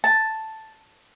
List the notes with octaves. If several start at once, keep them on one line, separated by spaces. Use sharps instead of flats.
A5